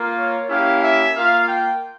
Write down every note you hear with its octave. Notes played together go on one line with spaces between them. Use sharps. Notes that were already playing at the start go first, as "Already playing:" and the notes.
Already playing: A#3 F4
C#5
A#3 C#4 E4 G4 F5
E5
A#3 F4 F5
G5